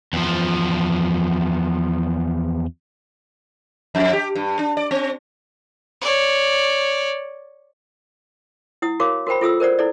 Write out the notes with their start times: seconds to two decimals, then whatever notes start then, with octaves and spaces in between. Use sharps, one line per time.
0.13 E2 F3
3.95 F2
4.13 G4
4.35 G2
4.59 D4
4.77 D5
4.91 C4
6.02 C#5 D5
8.82 E4 F#5 D#6
9.00 F#4 A#4 C#5 F5 D6
9.27 F#4 A#4 C5 G5 B5
9.41 F4 A4 D#6 E6
9.60 A#4 C5 D5 F#5
9.79 E4 A4 D5